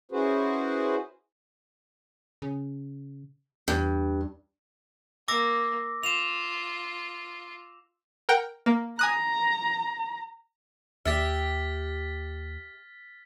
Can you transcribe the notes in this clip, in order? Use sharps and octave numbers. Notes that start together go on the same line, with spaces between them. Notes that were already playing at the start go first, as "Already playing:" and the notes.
C#4 E4 F#4 G#4 B4 C5
C#3
E2 G2
A#3 D6 E6 A#6
F4 E7 F7
A#4 F#5 G5
A#3
G#5 A#5 D#6 F#6
D#2 G4 E5 F6 A6 B6